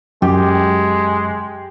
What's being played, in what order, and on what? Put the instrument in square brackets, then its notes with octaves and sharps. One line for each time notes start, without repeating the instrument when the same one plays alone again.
[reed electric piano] F#2 [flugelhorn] G#3 [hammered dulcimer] G4